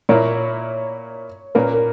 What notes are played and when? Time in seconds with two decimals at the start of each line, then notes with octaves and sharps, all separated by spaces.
0.09 A#2 A#3 E4 C#5
1.55 A#2 A#3 C#4 B4
1.73 A#4